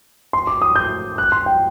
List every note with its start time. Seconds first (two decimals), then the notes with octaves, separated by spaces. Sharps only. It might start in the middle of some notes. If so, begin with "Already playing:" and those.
0.33 C6
0.47 D6
0.62 D#6
0.76 G6
1.18 F#6
1.32 C6
1.46 G5